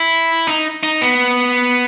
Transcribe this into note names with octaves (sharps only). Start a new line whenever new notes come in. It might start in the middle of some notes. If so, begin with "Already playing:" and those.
Already playing: E4
D#4
D#4
B3